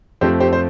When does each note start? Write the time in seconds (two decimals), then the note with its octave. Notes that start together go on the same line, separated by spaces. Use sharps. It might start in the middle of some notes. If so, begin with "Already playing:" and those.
0.21 F2 F3 A3 C4 G4 C5
0.40 G4 C5
0.53 C5